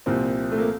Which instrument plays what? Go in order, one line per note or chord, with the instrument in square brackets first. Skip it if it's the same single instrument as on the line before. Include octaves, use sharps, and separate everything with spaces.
[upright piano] C2 A#2 F3 C4
A3
A#3